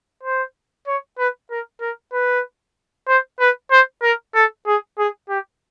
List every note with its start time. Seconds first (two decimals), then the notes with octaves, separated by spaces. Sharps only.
0.23 C5
0.87 C#5
1.18 B4
1.51 A#4
1.81 A#4
2.13 B4
3.08 C5
3.40 B4
3.71 C5
4.02 A#4
4.35 A4
4.67 G#4
4.98 G#4
5.29 G4